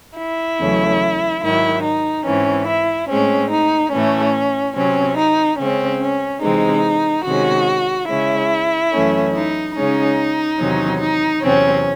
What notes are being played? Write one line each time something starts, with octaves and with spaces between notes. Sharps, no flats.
E4
E2 C#3 F#3 A3 C#4
G#2 D#3 F#3 E4
D#4
G#2 E3 C4 C#4
E4
A2 G#3 C4 C#4
D#4
A2 E3 A3 C#4
C3 F#3 C4 C#4
D#4
C#3 G#3 C4 C#4
C#4
C3 E3 G#3 C4 D#4
C3 D#3 G#3 C#4 F#4
C#3 G#3 C#4 E4
F#2 E3 A3 C#4
D#4
C#3 G#3 C#4 D#4
E2 C3 D#3 F#3 C#4
D#4
E2 C3 F#3 C4 C#4